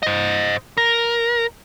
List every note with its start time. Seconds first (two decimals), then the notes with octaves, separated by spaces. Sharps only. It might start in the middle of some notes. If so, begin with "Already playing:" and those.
0.03 C5 D#5
0.78 A#4